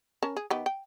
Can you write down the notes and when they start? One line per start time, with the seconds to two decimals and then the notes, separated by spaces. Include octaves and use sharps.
0.22 C#4 A#4 A5
0.36 G#4
0.50 D#3 B3 G4
0.66 G5